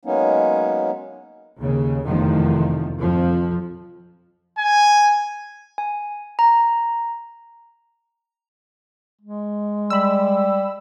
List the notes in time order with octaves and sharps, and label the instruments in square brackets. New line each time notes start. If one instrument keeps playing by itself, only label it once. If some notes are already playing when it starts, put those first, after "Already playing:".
[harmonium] F#3 G#3 A#3 B3 C#4 D#4
[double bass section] D#2 C#3
F1 E2 D#3 F3
F2 F3
[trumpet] G#5
[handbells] G#5
A#5
[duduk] G#3
[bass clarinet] G3 [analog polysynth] B5 E6